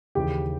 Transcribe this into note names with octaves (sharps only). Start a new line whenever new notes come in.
D#2 C#3 E3 G4 G5